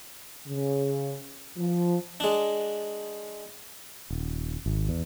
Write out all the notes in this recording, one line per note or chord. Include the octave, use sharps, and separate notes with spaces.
C#3
F3
G#3 D4
D#1
G#1
E2